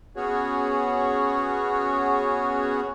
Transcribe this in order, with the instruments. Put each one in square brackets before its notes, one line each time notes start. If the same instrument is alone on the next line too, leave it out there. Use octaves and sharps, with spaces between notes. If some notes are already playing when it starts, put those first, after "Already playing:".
[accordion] B3 C#4 F#4 G#4 C#5